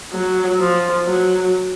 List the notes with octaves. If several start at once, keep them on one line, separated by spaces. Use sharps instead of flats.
F#3
F3
F#3